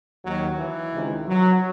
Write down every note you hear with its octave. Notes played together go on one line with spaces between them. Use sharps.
D#2 D#3 F#3
E3
C#2 C3 D#3
F#3